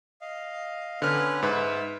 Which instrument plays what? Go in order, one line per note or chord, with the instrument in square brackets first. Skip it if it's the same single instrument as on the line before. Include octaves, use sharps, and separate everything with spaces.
[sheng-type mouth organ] D#5 F5
[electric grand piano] D3 F6 [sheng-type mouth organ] B3 C#4 B4
[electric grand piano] G#2 B4 [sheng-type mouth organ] E5